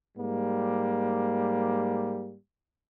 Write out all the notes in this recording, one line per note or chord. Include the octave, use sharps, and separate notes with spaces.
G#2 G3 A#3